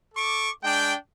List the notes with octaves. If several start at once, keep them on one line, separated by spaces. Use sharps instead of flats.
A4 C#6 D6
G#3 D4 G5